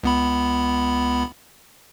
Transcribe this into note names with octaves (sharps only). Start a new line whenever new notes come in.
C#2 B3 B5